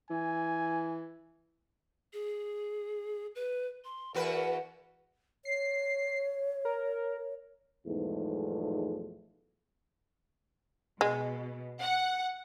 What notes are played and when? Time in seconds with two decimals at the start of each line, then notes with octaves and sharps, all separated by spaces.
0.11 E3 G#5
2.13 G#4
3.35 B4
3.84 C6
4.15 E2 F#4 A#4 B4
5.45 C#5 C7
6.65 A#4
7.87 B1 E2 G#2 F3 G#3 A3
11.01 B2 G#3
11.80 F#5